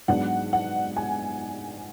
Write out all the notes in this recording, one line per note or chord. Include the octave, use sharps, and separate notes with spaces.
G#2 F#3 B3 D4 F#5
F#5
G#5